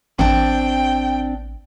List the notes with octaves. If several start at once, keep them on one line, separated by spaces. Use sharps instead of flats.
A1 C4 D4 G5